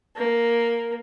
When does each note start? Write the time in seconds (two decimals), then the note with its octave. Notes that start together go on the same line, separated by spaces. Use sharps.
0.16 A#3